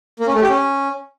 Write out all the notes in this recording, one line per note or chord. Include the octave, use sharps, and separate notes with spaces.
A#3
C#4
A3
G4
C#4